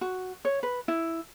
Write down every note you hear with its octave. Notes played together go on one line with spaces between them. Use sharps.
F#4
C#5
B4
E4